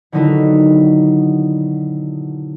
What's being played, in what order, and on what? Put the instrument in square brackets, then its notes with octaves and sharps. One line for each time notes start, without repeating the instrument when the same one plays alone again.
[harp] B2 D3 D#3 F#3 D#4 E4